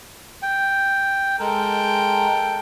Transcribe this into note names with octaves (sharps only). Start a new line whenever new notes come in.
G5
G#3 A4 A#4 G5